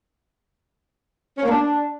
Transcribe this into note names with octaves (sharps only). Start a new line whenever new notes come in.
C#4
A#3
D4